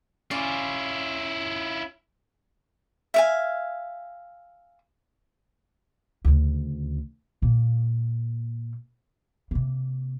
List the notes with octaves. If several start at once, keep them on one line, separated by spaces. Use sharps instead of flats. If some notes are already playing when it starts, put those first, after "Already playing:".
C#4 E4 F4 D5
E5 F5 G#5
D2 C#3
A#2 A#3
C3 A#3